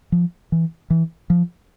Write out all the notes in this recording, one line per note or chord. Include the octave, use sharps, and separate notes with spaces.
F3
E3
E3
F3